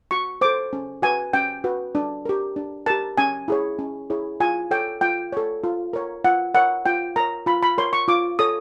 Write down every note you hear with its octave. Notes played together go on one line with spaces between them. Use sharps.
F#4 C#6
A4 C5 D6
C#4
F#4 B4 G#5
C#4 G5
F#4 B4
D4
G4 A#4
D4
G4 A#4 A5
C#4 G#5
E4 G#4 C#5
C#4
E4 G#4 C#5
F4 G#5
A4 C#5 G5
F4 G5
A4 C#5
F4
A#4 C#5
F4 F#5
A#4 C#5 F#5
F4 G5
A#4 C#5 A#5
F4 B5
B5
A#4 C#5 C6
C#6
F4 D6
A4 C#5 D#6